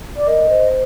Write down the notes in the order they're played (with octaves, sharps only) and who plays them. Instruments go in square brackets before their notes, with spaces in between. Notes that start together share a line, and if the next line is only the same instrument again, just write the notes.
[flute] D5
[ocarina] A#4 [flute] D#5
[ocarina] C5